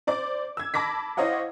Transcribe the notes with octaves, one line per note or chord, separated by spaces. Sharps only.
C5 D5 D6
E6 G#6
A5 B5 D6 A#6 B6
E4 C5 C#5 D#5 F5 F#5